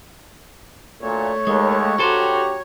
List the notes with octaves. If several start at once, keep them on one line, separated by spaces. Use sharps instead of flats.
D2 A#2 A3 C#5
D#2 G#3
G2 F#4 G4 A4 C5 A#5